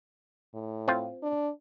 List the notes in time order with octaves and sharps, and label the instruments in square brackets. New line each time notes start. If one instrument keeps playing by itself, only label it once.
[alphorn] A2
[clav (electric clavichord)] C4 F4
[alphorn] D4